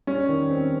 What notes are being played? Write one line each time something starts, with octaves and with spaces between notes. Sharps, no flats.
G3 C#4
D#3
C4